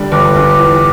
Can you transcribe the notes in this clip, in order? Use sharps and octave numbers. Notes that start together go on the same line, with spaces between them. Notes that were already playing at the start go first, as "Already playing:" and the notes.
Already playing: D3 G3
G1 G4
G1
E2